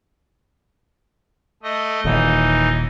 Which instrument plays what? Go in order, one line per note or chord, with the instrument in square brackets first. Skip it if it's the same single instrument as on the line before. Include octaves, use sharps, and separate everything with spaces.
[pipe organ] A3 D#5
[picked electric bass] D#1 D#2 [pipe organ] E3 D#4